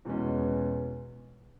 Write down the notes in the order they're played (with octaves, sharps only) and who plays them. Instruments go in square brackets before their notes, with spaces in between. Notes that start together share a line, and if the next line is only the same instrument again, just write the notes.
[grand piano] E2 B2 G#3 C#4